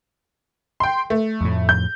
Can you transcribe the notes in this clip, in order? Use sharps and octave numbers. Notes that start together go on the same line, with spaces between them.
G5 C6
A3
F2 A2
G6